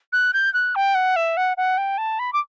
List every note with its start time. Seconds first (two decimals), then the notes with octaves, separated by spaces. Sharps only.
0.13 F#6
0.34 G6
0.54 F#6
0.75 G5
0.95 F#5
1.16 E5
1.37 F#5
1.57 F#5
1.78 G5
1.98 A5
2.19 B5
2.33 D6